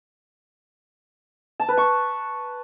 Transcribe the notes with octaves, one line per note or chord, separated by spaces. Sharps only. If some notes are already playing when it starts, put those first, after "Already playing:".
A5
B4
C#6